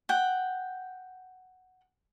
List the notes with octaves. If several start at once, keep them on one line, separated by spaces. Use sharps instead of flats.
F#5 G5